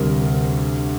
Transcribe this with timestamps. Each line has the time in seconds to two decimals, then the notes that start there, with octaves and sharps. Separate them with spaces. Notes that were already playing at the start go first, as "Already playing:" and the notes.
Already playing: D2 C3 G3 A#4